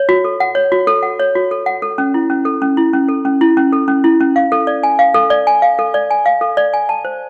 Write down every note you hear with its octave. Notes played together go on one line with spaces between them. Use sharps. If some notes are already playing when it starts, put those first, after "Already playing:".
Already playing: C#5
F#4
A4
F#5
C#5
F#4
A4
F#5
C#5
F#4
A4
F#5
A4
C#4
E4
C#4
A4
C#4
E4
C#4
A4
C#4
E4
C#4
A4
C#4
E4
C#4
F5
A4
D5
G#5
F5
A4
D5
G#5
F5
A4
D5
G#5
F5
A4
D5
G#5
A5
C5